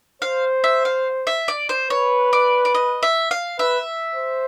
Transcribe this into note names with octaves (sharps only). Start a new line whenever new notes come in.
C5 F5
E5
F5
E5
D5
C5
B4 C#5
D5
D5
D#5
E5
F5
B4 E5
C5